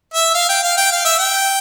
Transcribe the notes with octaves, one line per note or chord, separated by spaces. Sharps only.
E5
F5
G5
F5
G5
F5
E5
G5